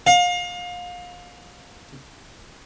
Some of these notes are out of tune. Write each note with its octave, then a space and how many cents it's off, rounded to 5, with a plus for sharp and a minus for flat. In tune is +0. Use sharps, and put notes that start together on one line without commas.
F5 +30